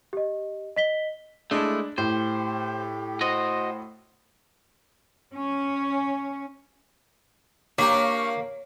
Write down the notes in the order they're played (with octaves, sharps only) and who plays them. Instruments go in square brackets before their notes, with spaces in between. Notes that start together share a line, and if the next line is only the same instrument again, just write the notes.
[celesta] G4 D#5
D#5 B6 G7
[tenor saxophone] G#3 [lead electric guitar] A3 E4 [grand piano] D4
[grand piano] A2 [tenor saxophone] G4 [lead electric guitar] C5
[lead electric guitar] F#4 D#5 [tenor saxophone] C5
[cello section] C#4
[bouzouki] A#3 [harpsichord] D4 G4 [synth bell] C#5 [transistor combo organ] F5 C#6